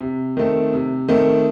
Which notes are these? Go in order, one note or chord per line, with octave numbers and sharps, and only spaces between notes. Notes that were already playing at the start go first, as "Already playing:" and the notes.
C3
D#3 A3 C4
C3
D#3 A3 C4